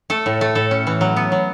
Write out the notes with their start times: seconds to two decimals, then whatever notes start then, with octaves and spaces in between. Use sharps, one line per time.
0.10 A3 A4
0.26 A2
0.41 A3
0.55 A2 A4
0.71 C#4
0.87 E3
1.01 F#3
1.16 B3
1.32 F#3